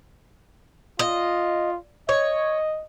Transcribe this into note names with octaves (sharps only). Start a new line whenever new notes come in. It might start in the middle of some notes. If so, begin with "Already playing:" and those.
F4 D#5
C#5 D#5